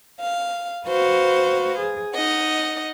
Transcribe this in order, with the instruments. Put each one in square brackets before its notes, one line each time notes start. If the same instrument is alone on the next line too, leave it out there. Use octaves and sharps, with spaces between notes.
[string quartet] F5
F#4 B4 C5 F5
G#4
D#4 D#5 F#5